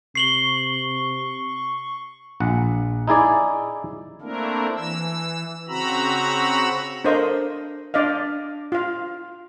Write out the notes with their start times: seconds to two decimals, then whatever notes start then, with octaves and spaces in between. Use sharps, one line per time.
0.15 C3 C#6 C7 F#7 G7
2.40 A#1 F#5
3.08 D#4 E4 G#4 D5
4.22 A3 A#3 C4 D4 E4 A#4
4.77 E3 E6
5.69 C#3 C4 F#4 A#5 B5 E6
7.04 D4 A4 A#4 C5 D#5 F5
7.94 D4 D5 D#5 F5
8.72 F4 F5